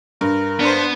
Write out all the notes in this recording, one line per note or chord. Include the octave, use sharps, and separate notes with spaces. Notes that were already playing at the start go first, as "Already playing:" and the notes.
G2 A#4
B3 D4 C5